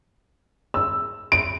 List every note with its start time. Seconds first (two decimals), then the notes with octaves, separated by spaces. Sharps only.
0.74 E6
1.32 D7